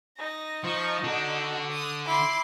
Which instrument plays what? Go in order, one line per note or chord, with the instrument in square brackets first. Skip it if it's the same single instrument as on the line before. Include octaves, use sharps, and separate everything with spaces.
[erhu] D#4 [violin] A#6
[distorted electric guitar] F3 [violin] C#6
[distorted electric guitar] D3 D4 [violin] F#4
[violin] D#6
[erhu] E4 [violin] C6 D6